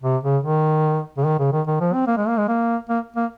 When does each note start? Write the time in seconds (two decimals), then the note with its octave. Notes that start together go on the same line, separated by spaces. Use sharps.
0.03 C3
0.23 C#3
0.44 D#3
1.18 C#3
1.25 D#3
1.39 C#3
1.53 D#3
1.67 D#3
1.81 F3
1.93 C4
2.07 A#3
2.17 G#3
2.28 A#3
2.37 G#3
2.48 A#3
2.89 A#3
3.16 A#3